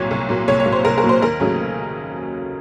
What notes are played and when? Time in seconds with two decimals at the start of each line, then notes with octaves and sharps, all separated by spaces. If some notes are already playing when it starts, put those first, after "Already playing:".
Already playing: C2 A#2 F#3 A#3 C#5
0.11 C2
0.29 A#2 F#3 A#3
0.48 C2 C#5
0.60 C#5
0.65 A#2 F#3 A#3
0.72 C5
0.85 C2 A#4
0.98 A#4
1.03 A#2 F#3 A#3
1.09 C5
1.21 D#2 A#4
1.40 C#3 F#3 A3 C#4